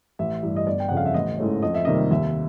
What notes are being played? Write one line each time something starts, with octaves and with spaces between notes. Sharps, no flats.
A1 E5
G2 E3
D#5
G1 D5
G5
F2 C#3 F3 F#5
F5
E5
A1 D#5
G#2 E3 A3 C#4
F2 D#5
E5
C3 D#3 G3 A#3 D#5
D#2 E5